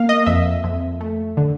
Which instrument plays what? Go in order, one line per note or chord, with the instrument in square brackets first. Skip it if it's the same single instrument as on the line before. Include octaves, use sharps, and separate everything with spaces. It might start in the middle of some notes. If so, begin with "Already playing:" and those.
Already playing: [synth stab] A#3 F5
D#5
F2 E5
F2
A3
D3